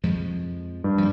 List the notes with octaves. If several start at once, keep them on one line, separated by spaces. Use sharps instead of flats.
F2 F3 G#3
G2
F3 A#3